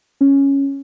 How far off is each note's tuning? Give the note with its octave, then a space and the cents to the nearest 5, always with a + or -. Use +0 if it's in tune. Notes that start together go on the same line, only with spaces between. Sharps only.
C#4 -5